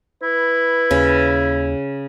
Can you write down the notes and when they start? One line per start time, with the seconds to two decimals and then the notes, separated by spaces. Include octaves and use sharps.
0.22 E4 B4
0.91 D#2 C#3